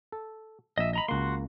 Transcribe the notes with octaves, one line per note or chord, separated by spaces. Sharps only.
A4
A#1 D#5 E5
D#5 A#5 B5
C#2 A#3 F#4 C6